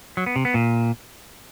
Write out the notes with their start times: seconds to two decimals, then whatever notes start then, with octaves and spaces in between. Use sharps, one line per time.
0.17 F#3
0.26 B3
0.36 C3
0.45 B3
0.54 A#2